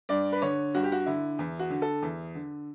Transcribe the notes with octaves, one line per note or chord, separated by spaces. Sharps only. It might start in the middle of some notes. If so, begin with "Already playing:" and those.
G2 D5
B4
D3 C#5
G2 F#4
G4
F#4
D3 E4
E2
F#4
D3
A4
E2
D3